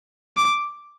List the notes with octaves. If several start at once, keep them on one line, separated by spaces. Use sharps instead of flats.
D6